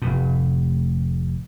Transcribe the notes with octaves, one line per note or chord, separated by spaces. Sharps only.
F1 A2